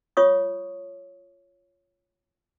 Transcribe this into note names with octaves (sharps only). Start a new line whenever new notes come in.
F4 C#5 C#6 D#6